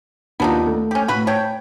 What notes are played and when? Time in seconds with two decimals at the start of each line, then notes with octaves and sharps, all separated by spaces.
0.40 D#2 B3 D4 D#4 F4
0.67 A3
0.91 C#4 G4
1.08 A2 F#4 B4
1.27 C#5 G5 A5